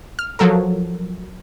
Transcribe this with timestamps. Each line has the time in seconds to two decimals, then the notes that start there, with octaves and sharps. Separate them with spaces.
0.19 F6
0.39 F3 F#3 A4 A#4